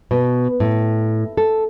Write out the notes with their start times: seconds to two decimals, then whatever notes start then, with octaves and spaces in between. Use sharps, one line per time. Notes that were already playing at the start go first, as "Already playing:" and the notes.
0.11 B2
0.60 A2
1.37 A4